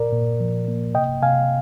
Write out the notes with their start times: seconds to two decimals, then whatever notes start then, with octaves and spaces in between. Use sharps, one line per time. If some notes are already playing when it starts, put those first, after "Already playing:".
Already playing: A#2 A#4 D5
0.12 A#2
0.40 F3
0.68 A#3
0.94 C3 D#5 G5
1.23 C3 F5 G#5